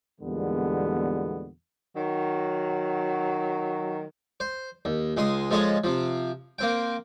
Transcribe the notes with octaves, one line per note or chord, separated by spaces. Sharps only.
E2 A#2 D3 G3 G#3 B3
D#3 F#3
C5
D#2
C#2 G#3 C6 D#6
F3 G#3 A4 C#5 D#5
C3 F3
A#3 C4 G5